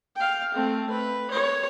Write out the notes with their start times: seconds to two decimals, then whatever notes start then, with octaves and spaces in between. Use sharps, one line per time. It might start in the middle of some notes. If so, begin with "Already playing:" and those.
0.16 F5 G5
0.54 A3 C4
0.90 B4
1.31 C#5